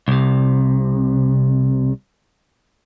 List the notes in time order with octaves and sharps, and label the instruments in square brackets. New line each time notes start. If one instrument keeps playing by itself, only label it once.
[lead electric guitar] C2 C3